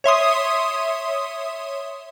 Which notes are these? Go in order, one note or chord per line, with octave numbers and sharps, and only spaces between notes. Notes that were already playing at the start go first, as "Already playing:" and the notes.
C#5 E5 C6 D#6